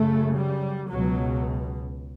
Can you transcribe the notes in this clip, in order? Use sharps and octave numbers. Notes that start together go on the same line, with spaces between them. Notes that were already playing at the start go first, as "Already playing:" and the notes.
Already playing: F#2 C#3 A3
G3
C#2 B2 F#3